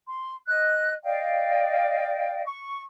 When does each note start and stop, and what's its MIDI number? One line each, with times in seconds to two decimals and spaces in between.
0.07 0.34 84
0.47 0.93 75
0.47 0.93 90
1.04 2.41 74
1.04 2.41 75
1.04 2.41 77
1.04 2.41 79
2.45 2.81 85